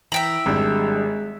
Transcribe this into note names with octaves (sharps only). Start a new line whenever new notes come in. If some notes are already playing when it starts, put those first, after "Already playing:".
E3 E5 G5 A#5 F#7
G#1 G3 G#3 D4 D#4